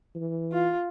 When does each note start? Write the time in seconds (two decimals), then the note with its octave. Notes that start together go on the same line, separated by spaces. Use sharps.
0.15 E3
0.52 F4